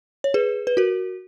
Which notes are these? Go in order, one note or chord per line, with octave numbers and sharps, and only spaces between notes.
C#5
G#4 B4
B4
F#4 A#4